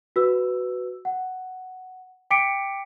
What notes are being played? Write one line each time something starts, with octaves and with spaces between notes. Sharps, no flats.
F#4 B4 E6
F#5
G5 D6 B6 C#7 D7